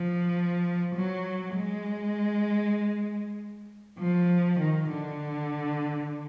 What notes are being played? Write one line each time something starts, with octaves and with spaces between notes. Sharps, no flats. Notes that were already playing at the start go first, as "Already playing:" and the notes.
Already playing: F3
F#3
G#3
F3
D#3
D3